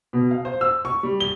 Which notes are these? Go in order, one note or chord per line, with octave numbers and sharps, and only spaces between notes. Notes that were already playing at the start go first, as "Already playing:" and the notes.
B2
F5
C5
E6
C#6
G3
G7